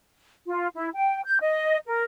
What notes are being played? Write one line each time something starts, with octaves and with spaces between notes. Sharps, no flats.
F4
E4
G5
G6
D#5
A#4